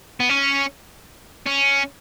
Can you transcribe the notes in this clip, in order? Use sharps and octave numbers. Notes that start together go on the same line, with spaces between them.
B3
C#4
C#4